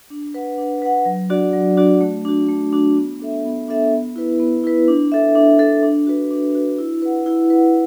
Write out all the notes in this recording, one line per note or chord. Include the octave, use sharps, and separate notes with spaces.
D4
B4 F#5
D4
B4 F#5
F#3
D4 F#4 D5
F#3
D4 F#4 D5
A3
D4 F#4
A3
D4 F#4
B3
D4 A4 E5
B3
D4 A4 E5
B3
E4 B4
B3
E4 B4
D4
A4 E5
D4
A4 E5
D4
F#4 B4
D4
F#4 B4
E4
B4 F#5
E4
B4 F#5